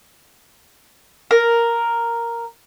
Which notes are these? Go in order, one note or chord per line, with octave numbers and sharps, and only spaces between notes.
A#4